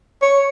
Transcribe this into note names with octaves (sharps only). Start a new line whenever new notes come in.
C#5